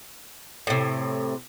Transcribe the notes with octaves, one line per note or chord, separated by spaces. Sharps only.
A2 C3